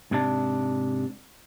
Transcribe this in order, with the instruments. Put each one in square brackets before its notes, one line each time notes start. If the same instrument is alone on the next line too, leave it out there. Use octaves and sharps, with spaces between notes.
[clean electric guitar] G#2 C3 D4